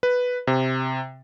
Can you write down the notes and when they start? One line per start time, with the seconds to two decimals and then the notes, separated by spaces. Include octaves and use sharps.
0.03 B4
0.47 C3